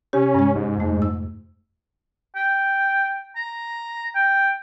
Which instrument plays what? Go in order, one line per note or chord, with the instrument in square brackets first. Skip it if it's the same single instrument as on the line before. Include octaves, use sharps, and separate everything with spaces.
[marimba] C3 G4 [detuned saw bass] C#4
[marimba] G2 G#3
[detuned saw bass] G#2
[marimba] F2 A3
E6
[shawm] G5
A#5
G5